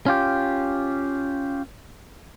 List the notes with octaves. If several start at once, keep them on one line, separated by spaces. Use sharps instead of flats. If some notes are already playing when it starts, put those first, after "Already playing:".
C#4 F4 G4